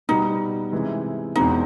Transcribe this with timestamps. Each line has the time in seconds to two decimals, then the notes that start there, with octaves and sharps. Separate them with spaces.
0.09 B2 G3 B3 D#4
0.72 C3 E3 G#3
1.36 E2 B2 G#3 C4 D#4